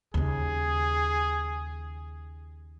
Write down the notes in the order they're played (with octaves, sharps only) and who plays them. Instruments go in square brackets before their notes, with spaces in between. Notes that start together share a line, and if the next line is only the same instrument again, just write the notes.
[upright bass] D#2 C#3 [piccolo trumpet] G#4